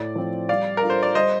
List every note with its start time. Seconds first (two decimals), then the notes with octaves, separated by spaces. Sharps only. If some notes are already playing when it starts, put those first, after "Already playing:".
Already playing: A2 D5
0.15 F3 C4
0.49 G3 D5 F5
0.77 A#4
0.82 D4 F4 A4
0.90 C5
1.03 D5
1.15 G3 C5 D#5